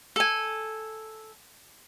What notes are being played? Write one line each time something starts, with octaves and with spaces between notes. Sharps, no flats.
A4 G#5